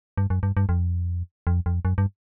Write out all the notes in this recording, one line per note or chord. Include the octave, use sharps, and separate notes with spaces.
G2
F#2
G2
G2
F2
F2
F2
F#2
G2